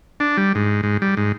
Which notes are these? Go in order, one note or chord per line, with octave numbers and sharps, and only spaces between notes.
D4
G3
G#2
G#2
G3
G#2